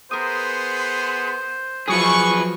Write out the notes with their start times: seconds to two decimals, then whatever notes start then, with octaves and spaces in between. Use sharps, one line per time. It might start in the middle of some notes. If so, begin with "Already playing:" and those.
0.11 B3 G#4 A#4 C5 C6 D#6
1.88 F3 F#3 G#4 B4 C#6